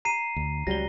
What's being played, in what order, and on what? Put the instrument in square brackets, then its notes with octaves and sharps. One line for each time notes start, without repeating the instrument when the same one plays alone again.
[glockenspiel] A#5 C7 D#7
[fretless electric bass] D2
[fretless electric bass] C#2 F#3 G3 [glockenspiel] A#6 G7